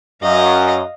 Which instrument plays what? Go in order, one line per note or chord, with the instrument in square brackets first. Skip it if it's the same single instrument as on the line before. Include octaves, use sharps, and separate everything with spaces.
[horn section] F#2 [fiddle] D#5 F5